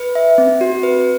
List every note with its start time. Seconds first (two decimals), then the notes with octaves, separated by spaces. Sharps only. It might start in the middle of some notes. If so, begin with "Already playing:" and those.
Already playing: B4
0.15 E5
0.38 C4
0.61 F#4
0.83 B4